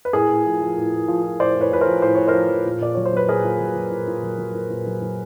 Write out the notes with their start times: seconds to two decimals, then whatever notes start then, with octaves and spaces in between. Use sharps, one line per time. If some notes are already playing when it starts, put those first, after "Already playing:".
0.05 B4
0.13 A2 G#4 A#4
0.29 A2
0.46 F3
0.61 F3
0.77 A2
0.92 A2
1.08 F3
1.24 F3
1.40 A2 C5 D5
1.55 A2
1.61 B4 C#5
1.71 F3 B4
1.81 A#4 C5
1.87 F3
2.02 A2 C5
2.15 A2 C#5
2.28 A#4 C5
2.34 F3
2.49 F3
2.66 A#2
2.81 A#2 D5
2.95 F#3 C#5
3.06 C5
3.13 F#3 B4
3.28 A#2 G#4 A#4
3.44 A#2
3.60 F#3
3.75 F#3
3.92 A#2
4.08 A#2
4.23 F#3
4.38 F#3
4.55 A#2
4.70 A#2
4.86 F#3
5.02 F#3